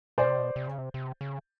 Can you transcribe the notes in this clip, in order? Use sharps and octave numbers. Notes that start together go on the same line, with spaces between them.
B2 C5 D5
C3
B2
C3
C#3
C3
C3
C#3